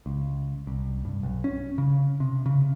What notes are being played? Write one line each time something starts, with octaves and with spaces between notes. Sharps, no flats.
C#2
C2
G2
B1
C#4
C#3
C3
C#3